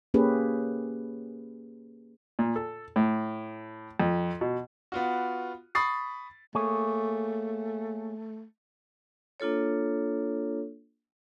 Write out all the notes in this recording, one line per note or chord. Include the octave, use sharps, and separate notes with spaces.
A#3 C#4 G4 G#4 B4
A#2
A4
A2
F2
B2
B3 F4 F#4
B5 C#6 D#6 A6 C7
A3 A#3 G#4 C#5
A#3 D4 F4 A4 C#5